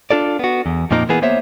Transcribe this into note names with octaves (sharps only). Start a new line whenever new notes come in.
D4 F4 A4 D5
B3 F#4
E2
F2 A#2 F3 A#3 D#4 A#4
E3 A#3 B3 G#4
A#3 B3 C5 C#5 E5